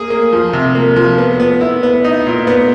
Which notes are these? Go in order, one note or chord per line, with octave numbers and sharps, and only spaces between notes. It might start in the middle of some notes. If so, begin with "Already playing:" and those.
Already playing: A#3 G#4
A#3
F3
C3
A#3
F3
B3
B3
E4
B3
D#4
A#2
B3